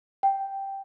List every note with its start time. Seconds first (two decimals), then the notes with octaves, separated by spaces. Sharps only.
0.23 G5